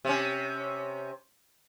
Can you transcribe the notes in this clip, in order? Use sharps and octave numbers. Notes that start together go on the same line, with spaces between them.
C3 C#4